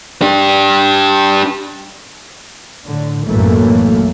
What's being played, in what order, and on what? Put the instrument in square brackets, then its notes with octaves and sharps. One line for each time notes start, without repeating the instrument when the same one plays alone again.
[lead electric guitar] D4 G4
[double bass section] A2 D3
B1 F#2 A2 E3 A3 A#3